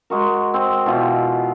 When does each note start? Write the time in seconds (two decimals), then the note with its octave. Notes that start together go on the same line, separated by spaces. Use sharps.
0.10 G#3 F#4 A#4
0.54 C4
0.86 B2 E3 F4